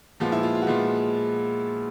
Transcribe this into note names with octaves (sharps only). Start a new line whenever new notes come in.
A#2 F3 G#3 B3 F4
E4
F4
F4
F#4
A#2 F3 G#3 B3 F4